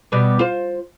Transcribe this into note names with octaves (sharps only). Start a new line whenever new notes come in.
B2 G3 B3
F4 C5